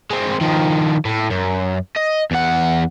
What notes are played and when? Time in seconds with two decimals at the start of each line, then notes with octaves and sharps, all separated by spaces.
0.10 G#3 C4
0.41 D#3 F3
1.05 A2
1.30 F#2
1.96 D#5
2.31 E2 F#5